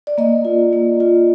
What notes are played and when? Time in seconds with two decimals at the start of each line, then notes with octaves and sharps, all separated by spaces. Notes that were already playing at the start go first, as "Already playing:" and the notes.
0.07 D5
0.18 A#3 D#5
0.45 F4
0.73 A#3
1.00 F4